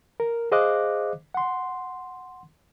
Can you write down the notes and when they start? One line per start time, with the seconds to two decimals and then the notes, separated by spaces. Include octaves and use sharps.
0.20 A#4
0.52 G#4 C5 D#5 F5 D6 F#6
1.34 F#5 C6